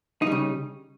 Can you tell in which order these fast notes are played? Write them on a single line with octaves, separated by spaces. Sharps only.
D#4 G3 C#3